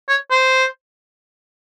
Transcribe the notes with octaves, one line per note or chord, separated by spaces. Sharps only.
C#5
C5